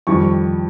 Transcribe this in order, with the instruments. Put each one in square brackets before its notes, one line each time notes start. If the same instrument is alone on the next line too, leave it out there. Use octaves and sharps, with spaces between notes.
[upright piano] F2 D#3 G3 C#6